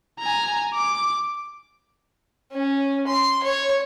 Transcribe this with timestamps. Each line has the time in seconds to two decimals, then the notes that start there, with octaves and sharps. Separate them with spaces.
0.19 G#5 A#5
0.74 D6
2.52 C#4
3.07 C6
3.43 C#5